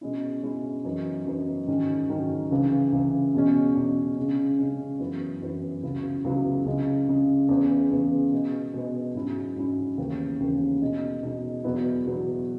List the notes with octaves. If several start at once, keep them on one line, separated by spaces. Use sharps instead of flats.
B2 G#3 C#4 E4
B2 G#3 C#4 E4
F#2 E3 B3 D#4
F#2 E3 B3 D#4
G#2 D#3 F#3 C#4
G#2 D#3 F#3 C#4
C#2 C#3 E3
C#2 C#3 E3
E2 B2 G#3 C#4
E2 B2 G#3 C#4
C#3 G#3 C#4
C#3 G#3 C#4
F#2 E3 B3 E4
F#2 E3 B3 E4
C#2 C#3 F#3 B3 E4
C#2 C#3 F#3 B3 E4
C#2 C#3 G#3
C#2 C#3 G#3
E2 C#3 E3 B3
E2 C#3 E3 B3
B2 G#3 B3
B2 G#3 B3
G#2 F#3 C#4 E4
G#2 F#3 C#4 E4
D#2 C#3 E3 B3
D#2 C#3 E3 B3
B2 G#3 D#4
B2 G#3 D#4
E2 B2 F#3 B3 E4
E2 B2 F#3 B3 E4